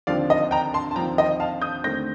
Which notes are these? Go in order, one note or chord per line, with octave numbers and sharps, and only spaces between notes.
D#2 D3 F3 C4 D5 F5
D#5
G5 A#5
A5 C6
A5
D#2 D3 F3 C4 G5 A#5
D#5 G5
F5 A5
D#6 G6
D#2 D3 A3 C4 G6 A#6